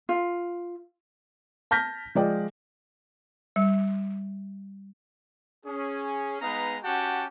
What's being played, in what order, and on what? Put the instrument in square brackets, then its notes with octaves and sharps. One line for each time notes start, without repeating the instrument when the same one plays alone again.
[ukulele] F4
[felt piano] A5 F6 G6 A#6 B6
F3 G#3 D5 G5
[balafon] G3
[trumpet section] C#4 G#4
G#3 B3 D#4 B4 F5 A#5
C#4 F#4 G4 F#5 G5 A5